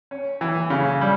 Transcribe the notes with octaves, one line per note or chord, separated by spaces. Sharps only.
C#4
E3
C#3
G3